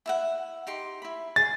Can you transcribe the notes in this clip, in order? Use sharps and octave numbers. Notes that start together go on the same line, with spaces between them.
E4 E5 F#5
D#4 G4 C6
E4 B5
G#4 A6